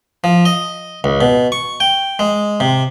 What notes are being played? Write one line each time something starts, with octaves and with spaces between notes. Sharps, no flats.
F3
D#5
C#2
B2
C#6
G5
G#3
C3